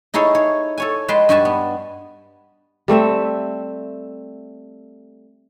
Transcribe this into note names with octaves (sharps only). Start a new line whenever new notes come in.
D#4 E4 G#4 A4 C#5
C#5
A4 C#5 G#5
G#3 B4 G5 A5 C6
G2 F#4 G4 G#5 A5
B3
G3 A3 C4 E5